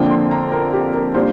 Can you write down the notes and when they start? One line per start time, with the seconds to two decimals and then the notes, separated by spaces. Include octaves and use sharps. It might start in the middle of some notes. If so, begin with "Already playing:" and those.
Already playing: F2 D3 A#3 D4 G5
0.10 C6
0.31 A#5
0.52 A#4
0.73 G4
0.94 A#4
1.14 A#2 G3 A#3 D4 C5